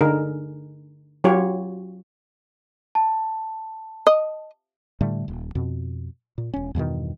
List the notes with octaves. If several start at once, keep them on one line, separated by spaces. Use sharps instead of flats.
D3 D#4 G#4 A#4
F#3 F4 G4 C#5
A5
D#5
A2 D3 G3 A3
D#1
F2 B2
A#2
E1 C#4
E2 G2 B2 D#3